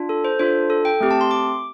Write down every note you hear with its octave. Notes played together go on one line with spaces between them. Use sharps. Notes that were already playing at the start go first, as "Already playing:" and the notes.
Already playing: D4 F4
A4
C5
D4 F4 A4 C5
A4
G5
A3 C4 G4
A5
C6
D6